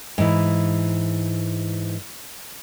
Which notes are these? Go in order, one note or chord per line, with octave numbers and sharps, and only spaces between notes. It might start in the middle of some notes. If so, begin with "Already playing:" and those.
G#2 E3